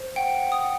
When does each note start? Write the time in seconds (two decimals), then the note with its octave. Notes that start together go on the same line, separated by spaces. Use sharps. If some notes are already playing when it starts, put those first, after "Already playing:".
Already playing: C5
0.16 F#5 G5
0.40 F#5
0.52 D#6
0.63 F#5